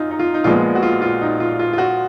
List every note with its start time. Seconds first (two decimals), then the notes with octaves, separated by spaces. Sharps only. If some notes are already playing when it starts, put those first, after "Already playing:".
Already playing: F#2 D#4 F4
0.11 D#4
0.19 F4
0.34 D#4
0.44 A#1 A#2 F3 G#3 B3 F4
0.75 F#4
0.83 F4
1.02 F4
1.21 D#4
1.40 F4
1.59 F4
1.73 F4
1.78 F#4